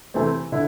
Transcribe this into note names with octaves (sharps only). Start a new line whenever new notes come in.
C3 E3 A3 C4
D3 E4